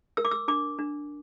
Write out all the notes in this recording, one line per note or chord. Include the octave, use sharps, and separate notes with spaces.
A#4 E6
D6
E6
D4 D6
D4